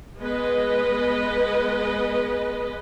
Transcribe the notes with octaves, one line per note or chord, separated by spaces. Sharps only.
G#3 B3 B4 D#5